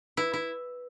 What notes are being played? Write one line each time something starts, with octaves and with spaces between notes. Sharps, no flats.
E4 B4
E4